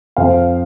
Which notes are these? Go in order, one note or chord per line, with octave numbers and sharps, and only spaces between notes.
F2 F3 C5 F5